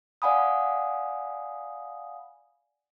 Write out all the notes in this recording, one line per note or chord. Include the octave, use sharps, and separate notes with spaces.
D5 F5 F#5 G#5 B5 D#6